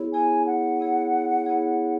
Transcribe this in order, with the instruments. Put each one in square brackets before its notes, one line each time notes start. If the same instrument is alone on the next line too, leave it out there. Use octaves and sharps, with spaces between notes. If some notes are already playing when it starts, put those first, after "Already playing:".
Already playing: [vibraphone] B3 E4 G#4 C#5
[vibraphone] B3 E4 G#4 C#5 [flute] G#5
[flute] F#5
[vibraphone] B3 E4 G#4 C#5
B3 E4 G#4 C#5